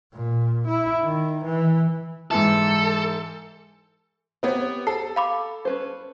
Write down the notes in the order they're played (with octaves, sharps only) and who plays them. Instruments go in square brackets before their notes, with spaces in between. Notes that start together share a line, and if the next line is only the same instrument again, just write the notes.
[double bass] A#2
E4
D#3
E3
[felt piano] G#2 E3 [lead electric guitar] A4
[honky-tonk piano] B3 C4 [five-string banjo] G4 C#5
[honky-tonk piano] A4 [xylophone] C7
[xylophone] F5 B5 D6
[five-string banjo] C#4 B4 C5